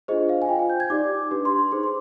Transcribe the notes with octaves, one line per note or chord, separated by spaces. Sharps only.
D4 F4 G#4 C5 D#5
F5
G#5
F4 C5 G5
G#5
G6
G#6
D#4 G4 D5 D6
D4 G4 B4
C6
C6
D#4 G#4 C5 D6
C6